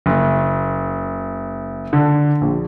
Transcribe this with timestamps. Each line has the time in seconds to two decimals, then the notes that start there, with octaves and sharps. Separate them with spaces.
0.06 F#1
1.93 D3
2.41 A#1